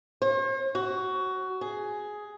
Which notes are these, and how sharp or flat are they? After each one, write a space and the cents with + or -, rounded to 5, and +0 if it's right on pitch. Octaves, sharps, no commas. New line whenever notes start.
C5 +45
F#4 +15
G#4 +10